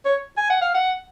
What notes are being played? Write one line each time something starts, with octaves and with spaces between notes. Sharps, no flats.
C#5
G#5
F#5
F5
F#5